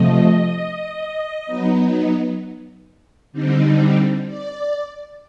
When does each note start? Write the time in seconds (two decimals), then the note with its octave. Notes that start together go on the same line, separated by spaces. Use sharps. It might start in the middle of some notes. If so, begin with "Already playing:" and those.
Already playing: C3 F3 A3 D#5
1.47 F#3 B3 D#4
3.32 D3 G3 C4 D#4
4.26 D5